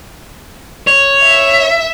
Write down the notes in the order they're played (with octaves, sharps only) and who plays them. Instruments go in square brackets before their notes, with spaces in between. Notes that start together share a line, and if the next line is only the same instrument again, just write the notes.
[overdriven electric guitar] C#5
[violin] E5